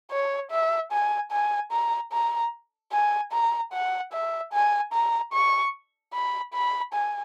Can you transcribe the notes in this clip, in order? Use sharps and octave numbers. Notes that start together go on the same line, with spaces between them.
C#5
E5
G#5
G#5
A#5
A#5
G#5
A#5
F#5
E5
G#5
A#5
C#6
B5
B5
G#5